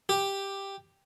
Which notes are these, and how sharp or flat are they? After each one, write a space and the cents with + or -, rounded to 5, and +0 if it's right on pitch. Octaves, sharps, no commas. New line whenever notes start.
G4 +5